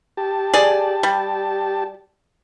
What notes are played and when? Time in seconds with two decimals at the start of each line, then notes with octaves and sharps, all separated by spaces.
0.17 G4 A5
0.54 G#4 D5
1.03 G3